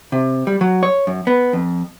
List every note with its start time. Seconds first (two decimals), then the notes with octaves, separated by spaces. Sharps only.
0.12 C3
0.47 G3
0.61 F#3
0.83 C#5
1.07 F#2
1.27 B3
1.53 F2